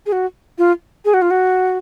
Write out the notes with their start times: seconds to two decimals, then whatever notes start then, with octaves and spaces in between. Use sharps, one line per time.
0.06 G#4
0.12 F#4
0.58 F4
1.05 G#4
1.14 F#4
1.22 F4
1.31 F#4